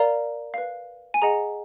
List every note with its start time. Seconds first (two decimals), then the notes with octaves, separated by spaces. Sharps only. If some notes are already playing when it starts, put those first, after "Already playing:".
Already playing: A#4 D5 F5 A#5
0.54 B4 F5
1.14 G#5
1.22 G#4 D#5 F#5 A#5